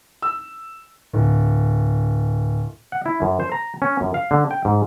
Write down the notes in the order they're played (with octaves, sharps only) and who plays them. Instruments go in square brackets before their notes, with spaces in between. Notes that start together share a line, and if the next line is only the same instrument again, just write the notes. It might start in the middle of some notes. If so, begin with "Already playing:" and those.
[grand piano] E6
D1
[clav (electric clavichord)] F#5
E4
F#2
C5
A#5
C#4
F#2
F5
D3
G5
G#2